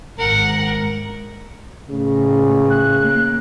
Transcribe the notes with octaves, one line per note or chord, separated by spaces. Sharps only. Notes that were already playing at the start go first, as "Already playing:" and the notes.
G#1 A#4 F#5
A2 C#3
F#6
A#3